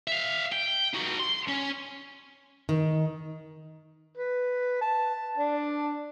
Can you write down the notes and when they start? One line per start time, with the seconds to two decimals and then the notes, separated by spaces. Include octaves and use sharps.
0.08 E5 F5
0.52 G5
0.94 D#4 F#4
1.20 C6
1.48 C#4
2.69 D#3
4.17 B4
4.81 A5
5.37 D4